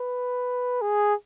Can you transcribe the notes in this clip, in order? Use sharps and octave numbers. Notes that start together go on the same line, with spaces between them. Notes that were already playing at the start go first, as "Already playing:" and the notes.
Already playing: B4
G#4